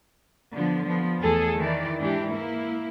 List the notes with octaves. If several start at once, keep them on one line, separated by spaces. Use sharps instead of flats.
D3 F3 B3
F3 B3
E2 A3 G#4 A4
D#3 E3 D5
G#2 E3 D4 G4
A#3 E4